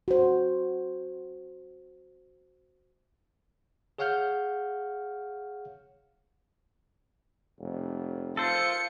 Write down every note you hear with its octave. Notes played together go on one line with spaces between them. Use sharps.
F#4 C5
G#4 C#5 F5 F#5 F6 G6
F1
F4 A4 C5 C#7